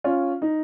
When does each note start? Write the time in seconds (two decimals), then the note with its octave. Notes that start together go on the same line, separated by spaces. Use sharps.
0.04 C#4 F4
0.42 D#4